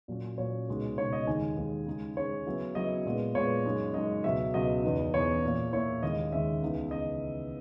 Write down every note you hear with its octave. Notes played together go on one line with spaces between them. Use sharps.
A#2 F#3 C#4
A#2 F#3 C#4 C#5
C#2 B2 G#3 D#4
C#2 B2 G#3 D#4 C#5
D#5
D#2 D#3 G#3 D#4 G#5
D#2 D#3 G#3 D#4
C#3 G#3 D#4
C#3 G#3 D#4 C#5
C#3 F#3 B3 E4
C#3 F#3 B3 E4 D#5
A#2 G#3 B3
A#2 G#3 B3 C#5
F#2 C#3 G#3 D#4
F#2 C#3 G#3 D#4 D#5
C#2 B2 F#3 C#4 E5
C#2 B2 F#3 C#4 D#5
E2 C#3 E3 B3 D#4
E2 C#3 E3 B3 D#4 C#5
A#2 A#3 E4
A#2 A#3 E4 C#5
D#2 D#3 G#3 C#4 D#5
D#2 D#3 G#3 C#4 E5
C#2 C#3 E3 B3 D#4
C#3 D#5